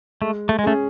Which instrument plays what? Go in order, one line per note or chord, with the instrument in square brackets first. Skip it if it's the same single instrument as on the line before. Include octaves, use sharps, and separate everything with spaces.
[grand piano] G#3 [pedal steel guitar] A3
[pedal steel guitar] A3
G#3
[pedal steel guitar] A3 [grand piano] C#4 G#4